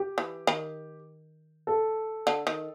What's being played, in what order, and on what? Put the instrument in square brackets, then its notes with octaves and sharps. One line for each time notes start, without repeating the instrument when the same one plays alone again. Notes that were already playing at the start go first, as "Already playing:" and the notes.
Already playing: [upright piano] G4
[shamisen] E3
D#3
[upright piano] A4
[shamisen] D3
D#3